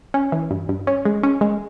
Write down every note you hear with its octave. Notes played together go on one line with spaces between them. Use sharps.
C#4
E3
G2
G2
C#4
G#3
C#4
G#3